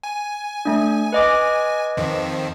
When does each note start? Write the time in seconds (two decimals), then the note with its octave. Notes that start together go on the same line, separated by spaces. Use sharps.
0.03 G#5
0.65 A3 D4
1.12 B4 D#5 D6
1.97 F2 D#3 F3